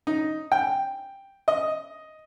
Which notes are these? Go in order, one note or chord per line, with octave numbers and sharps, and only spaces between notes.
D#4
G5
D#5